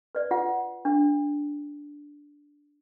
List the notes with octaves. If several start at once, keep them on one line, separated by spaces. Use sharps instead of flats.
B4 D5
F4 F#5
D4